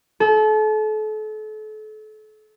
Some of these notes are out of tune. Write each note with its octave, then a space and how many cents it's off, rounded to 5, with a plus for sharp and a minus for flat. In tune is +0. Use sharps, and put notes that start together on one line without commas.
A4 -35